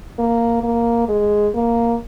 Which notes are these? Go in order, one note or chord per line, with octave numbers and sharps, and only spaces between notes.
A#3
A#3
G#3
A#3